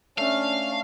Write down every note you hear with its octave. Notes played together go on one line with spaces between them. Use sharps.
A3 C#4 D4 F5